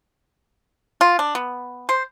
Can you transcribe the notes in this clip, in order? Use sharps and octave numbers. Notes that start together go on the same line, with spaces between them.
F4
D4
B3
C5